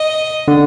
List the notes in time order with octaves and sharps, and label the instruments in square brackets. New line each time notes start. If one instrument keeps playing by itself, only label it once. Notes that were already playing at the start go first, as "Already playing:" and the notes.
Already playing: [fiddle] D#5
[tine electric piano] D3